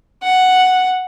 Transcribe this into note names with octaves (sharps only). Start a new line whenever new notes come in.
F#5